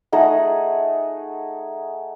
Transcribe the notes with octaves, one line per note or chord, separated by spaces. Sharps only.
A3 D#4 G#4 F#5